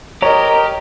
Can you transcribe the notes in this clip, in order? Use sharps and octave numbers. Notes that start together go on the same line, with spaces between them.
G4 A#4 C#5 D#5 A#5